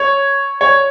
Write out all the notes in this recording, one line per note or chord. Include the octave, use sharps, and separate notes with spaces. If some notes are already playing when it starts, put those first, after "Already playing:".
Already playing: C#5
C#5